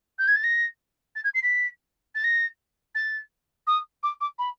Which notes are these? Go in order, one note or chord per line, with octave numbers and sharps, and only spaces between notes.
G6
G#6
A6
A#6
A6
G#6
C7
B6
A6
A#6
A6
D#6
D6
D6
B5